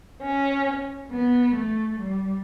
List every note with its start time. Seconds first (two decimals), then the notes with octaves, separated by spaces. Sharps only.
0.22 C#4
1.11 B3
1.56 A3
2.00 G3